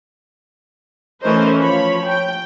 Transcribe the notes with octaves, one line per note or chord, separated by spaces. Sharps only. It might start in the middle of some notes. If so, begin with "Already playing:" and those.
E3 A3 C#4 A#4 C5 D#5
F3 F4 C#5 B5
G5